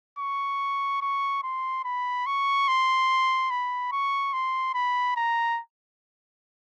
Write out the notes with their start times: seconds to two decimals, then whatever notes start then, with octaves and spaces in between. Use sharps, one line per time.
0.19 C#6
1.02 C#6
1.43 C6
1.85 B5
2.27 C#6
2.68 C6
3.50 B5
3.92 C#6
4.33 C6
4.75 B5
5.17 A#5